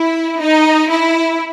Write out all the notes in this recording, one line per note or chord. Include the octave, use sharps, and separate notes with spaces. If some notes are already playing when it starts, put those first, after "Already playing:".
Already playing: E4
D#4
E4